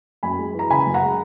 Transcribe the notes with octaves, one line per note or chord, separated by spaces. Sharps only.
F#2 G#5 B5
G#3
E3 A#5
C#3 G#5 B5
F#2
F#5 A#5
G#3